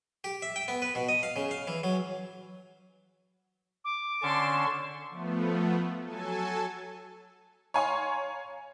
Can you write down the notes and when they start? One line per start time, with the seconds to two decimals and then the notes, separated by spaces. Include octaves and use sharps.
0.24 G4
0.42 E5
0.56 G5
0.68 B3
0.82 B4
0.95 B2
1.09 D#5
1.23 F5
1.36 C#3
1.51 F5
1.67 E3
1.84 F#3
3.85 D6
4.23 D3 C#4 A5 C6 C#6
5.10 F3 A3 B3
6.01 F#3 A4 G#5 A5
7.74 C#5 F5 G#5 A#5 C6 C#6